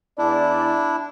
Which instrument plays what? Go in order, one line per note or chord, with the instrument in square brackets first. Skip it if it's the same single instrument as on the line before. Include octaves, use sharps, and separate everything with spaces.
[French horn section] E2 D5 [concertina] D4 E4